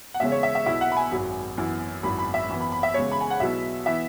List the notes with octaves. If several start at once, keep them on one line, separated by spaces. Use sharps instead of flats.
F#5
E1 E2 C#3 G#3 C#4 E5
C#5
E5
E5
B1 B2 B3 E4 E5
F#5
B5
G#5
G#1 F#2 F#3
F#2 E3 B3 E4
G#1 F#2 F#3 E4 B5
B5
E5
F#2 E3 B3 E4
B5
B5
E5
E1 E2 C#3 G#3 C#5
B5
G#5
F#5
B1 B2 F#3 B3 E4 E5
E3 B3 E4 E5